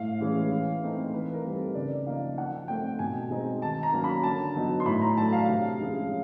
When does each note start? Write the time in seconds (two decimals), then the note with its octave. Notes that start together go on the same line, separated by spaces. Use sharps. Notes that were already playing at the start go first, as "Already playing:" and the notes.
Already playing: A2 F5
0.20 E3 G#3 C#4
0.52 E3
0.82 A3 C4 D#4
1.14 E3 B4
1.33 A#4
1.45 G3 C4 D#4
1.54 A4
1.75 C#3 D5
2.07 F3 A#3 D#4 F5
2.37 F3 F#5
2.68 A3 C4 D#4 G5
2.99 B2 G#5
3.30 G#3 C4 D#4
3.62 D#3 A5
3.83 A#5
3.93 F#3 A#3 C#4
4.04 B5
4.23 D3 A5
4.55 F#3 B3 D#4
4.80 C6
4.86 A2 B5
5.02 A#5
5.17 F#3 A3 D4 A5
5.33 F5
5.48 C3 F5
5.80 F3 G#3 C#4